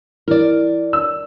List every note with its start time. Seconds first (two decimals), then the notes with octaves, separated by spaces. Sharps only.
0.28 E3 A#4 D5
0.93 E6